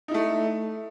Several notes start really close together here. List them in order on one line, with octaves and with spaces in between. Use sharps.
D#4 E4 A3